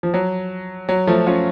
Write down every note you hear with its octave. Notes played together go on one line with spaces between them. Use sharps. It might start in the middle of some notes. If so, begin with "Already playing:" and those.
F3
F#3
F#3
F3 A3
C#4 F4